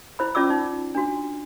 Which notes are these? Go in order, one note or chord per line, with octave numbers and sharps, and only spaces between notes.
E4 C5 B5
C#4 F4 D5 D6 E6
D#4
D4 F#4